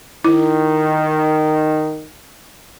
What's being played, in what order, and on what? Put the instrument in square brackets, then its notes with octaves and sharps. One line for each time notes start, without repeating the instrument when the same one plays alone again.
[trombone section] D#3 [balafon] E4